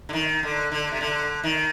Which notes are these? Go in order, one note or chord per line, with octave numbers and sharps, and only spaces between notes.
D3
D#3
D3
D3
C3
D3
D#3